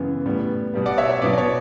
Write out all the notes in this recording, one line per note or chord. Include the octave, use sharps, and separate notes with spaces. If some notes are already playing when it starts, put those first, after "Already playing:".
Already playing: F#2 C#3 E3 B3
A2 G3 B3
B2 G3 B3
D5 F#5
C#5 E5
C#5
B2 F#3 B3 D5
D5
C#5